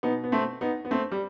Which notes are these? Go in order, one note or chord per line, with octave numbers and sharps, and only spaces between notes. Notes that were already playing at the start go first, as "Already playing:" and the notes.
B2 B3 D#4
B3
A3 C4
B3 D#4
B3
A3 C4
G3